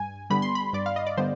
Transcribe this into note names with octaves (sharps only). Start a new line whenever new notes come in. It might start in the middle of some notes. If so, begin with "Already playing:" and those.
Already playing: G2 G#5
D3 G3 B3 B5
C6
B5
G2 D5
F5
D#5
D5
D3 G3 B3 C5